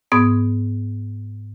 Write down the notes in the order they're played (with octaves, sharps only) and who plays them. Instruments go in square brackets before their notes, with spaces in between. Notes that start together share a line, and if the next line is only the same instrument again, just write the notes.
[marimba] G#2 B3 D#6 G#6